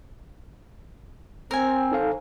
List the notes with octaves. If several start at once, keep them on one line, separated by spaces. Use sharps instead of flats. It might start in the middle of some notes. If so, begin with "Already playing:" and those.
C4 A#4 C5 G#5
D#4 A4 F5